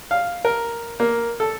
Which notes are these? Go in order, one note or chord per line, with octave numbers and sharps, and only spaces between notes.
F5
A#4
A#3
A4